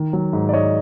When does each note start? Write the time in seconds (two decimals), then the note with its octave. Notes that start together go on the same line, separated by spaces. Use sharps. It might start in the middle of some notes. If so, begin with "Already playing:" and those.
Already playing: D#3
0.13 F#3
0.33 G#2
0.49 D5
0.53 G#2 C#5 D#5